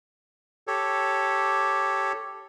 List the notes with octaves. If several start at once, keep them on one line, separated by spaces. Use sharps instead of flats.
G4 A4 C#5